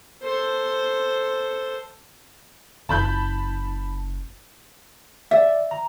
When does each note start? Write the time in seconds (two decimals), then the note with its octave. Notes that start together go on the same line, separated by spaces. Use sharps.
0.22 A4 C5
2.89 F#1 A5 B5 G6
5.31 D5 E5
5.71 A#5